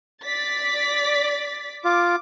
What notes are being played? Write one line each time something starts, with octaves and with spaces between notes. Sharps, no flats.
D5 A6 B6
F4 D6